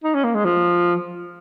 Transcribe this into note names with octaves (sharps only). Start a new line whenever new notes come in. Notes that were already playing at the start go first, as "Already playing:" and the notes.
D#4
C#4
A#3
G#3
F3